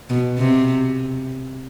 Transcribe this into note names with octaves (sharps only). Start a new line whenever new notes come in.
B2
C3